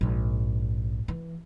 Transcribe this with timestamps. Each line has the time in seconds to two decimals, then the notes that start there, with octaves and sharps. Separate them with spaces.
0.01 A#1 G#2
1.08 E3